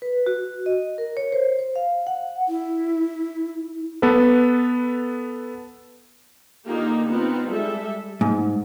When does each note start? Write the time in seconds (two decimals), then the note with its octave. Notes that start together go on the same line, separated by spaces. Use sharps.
0.02 B4
0.26 F#4
0.66 D#5
0.98 A#4
1.17 C#5
1.32 C5
1.59 C5
1.76 F5
2.07 F#5
2.48 E4
4.02 B3 A4 B4
6.65 D3 A#3 D#4 F4 G4
7.09 B3 C4 D#4 F4
7.49 G3 G#3 A4 E5
8.21 G#2